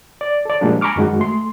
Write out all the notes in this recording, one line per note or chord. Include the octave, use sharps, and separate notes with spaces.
D5
A4 D5
A#2 F3 G3 G#3 A#3 D4
G#5 A#5 B5 C#6 D6 F6
F#2 D#3 G#3 F#4
A3 C6